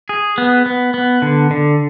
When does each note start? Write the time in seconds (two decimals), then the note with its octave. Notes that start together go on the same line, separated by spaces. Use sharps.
0.09 G#4
0.38 B3
0.66 B3
0.94 B3
1.22 D3
1.51 D3